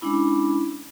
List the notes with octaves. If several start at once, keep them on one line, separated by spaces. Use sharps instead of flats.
G#3 C#4 D4 E4 B5